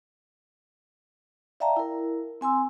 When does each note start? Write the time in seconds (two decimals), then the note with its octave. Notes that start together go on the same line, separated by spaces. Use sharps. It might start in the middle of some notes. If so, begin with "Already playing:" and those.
1.60 D5 E5 F5 G5 A5 A#5
1.77 E4 A#4
2.41 C4 G#5 C6 E6